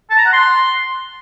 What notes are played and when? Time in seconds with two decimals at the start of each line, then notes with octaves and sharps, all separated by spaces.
0.10 A5
0.18 A#5
0.26 F#5
0.33 C6